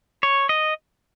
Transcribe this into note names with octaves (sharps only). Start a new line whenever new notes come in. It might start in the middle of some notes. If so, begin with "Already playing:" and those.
C#5
D#5